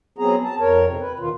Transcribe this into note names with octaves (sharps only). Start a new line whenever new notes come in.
F#3 B3 C4 G#4 A#5
A5
F2 A#4 C#5
E2 G#2 C3 C4
B4
D#2 B2 D#3 F4